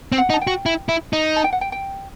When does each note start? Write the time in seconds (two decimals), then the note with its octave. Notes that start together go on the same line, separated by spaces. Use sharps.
0.12 C4
0.18 F#5
0.30 D#4
0.34 A5
0.41 G5
0.47 F#4
0.66 E4
0.89 E4
1.13 D#4
1.36 A5
1.44 G5
1.53 F#5
1.61 G5
1.72 G5